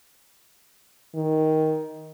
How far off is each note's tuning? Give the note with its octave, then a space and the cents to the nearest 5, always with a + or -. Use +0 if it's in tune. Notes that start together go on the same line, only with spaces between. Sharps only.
D#3 +10